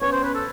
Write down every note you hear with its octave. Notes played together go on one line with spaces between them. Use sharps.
B3 C#4 C#5
C5
B4
A4